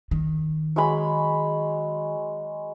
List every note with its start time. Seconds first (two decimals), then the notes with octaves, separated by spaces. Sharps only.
0.11 D#3
0.76 F#3 G#3 B5